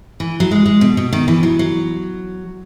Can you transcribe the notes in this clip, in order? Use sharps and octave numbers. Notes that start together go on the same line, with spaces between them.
E3
F#3
G#3
G#3
B2
B2
D#3
E3
F#3
F#3